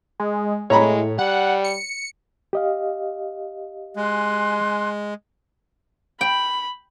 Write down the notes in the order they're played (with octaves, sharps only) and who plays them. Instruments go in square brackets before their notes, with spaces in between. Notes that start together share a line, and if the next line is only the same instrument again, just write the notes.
[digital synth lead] G#3
[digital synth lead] A2 [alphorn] G#3 [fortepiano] C#5 A#5 B5
[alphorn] G3 [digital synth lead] F#5
[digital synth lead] C#7
[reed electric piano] G4 D#5 F5
[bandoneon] G#3 [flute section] G#5 C6 F#6
[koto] G5 [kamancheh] B5